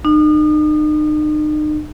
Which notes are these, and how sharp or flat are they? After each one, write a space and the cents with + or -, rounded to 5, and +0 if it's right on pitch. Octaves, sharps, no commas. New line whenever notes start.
D#4 -40